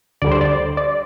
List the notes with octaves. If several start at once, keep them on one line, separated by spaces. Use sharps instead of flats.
D2 D3 G3 D5
C5
D5
D5